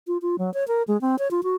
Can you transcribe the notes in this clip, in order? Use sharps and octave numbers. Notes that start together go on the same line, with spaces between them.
F4
F4
F#3
C#5
A#4
G#3
C4
C#5
F4
F#4